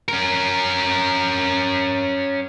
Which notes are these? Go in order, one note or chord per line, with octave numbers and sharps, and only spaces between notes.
C#4 A#4